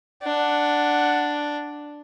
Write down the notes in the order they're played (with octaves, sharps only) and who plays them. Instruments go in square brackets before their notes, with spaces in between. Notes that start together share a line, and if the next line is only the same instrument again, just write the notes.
[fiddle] D4 [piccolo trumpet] F#5